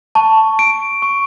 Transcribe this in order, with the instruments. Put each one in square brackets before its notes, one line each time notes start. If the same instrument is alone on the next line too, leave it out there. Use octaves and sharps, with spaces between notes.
[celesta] A5 [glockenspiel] C#6
[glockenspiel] D7
C#6